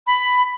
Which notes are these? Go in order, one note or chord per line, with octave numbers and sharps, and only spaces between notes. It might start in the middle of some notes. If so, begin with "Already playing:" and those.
B5